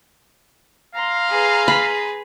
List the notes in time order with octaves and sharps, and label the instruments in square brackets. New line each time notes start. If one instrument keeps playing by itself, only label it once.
[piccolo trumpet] F5 [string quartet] A#5 C6
[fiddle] G#4 B4
[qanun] B5